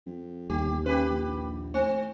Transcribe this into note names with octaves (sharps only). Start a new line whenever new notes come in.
F2
G1 D#2 G4
C#3 G4 B4
A#1
A2 C4